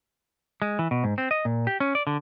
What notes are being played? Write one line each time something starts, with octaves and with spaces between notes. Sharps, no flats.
G#3
E3
B2
G#2
C4
D#5
A#2
G4
C#4
D5
D3